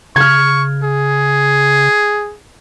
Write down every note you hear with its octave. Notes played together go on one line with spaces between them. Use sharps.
C#3 C#6 F6 G#6
G#4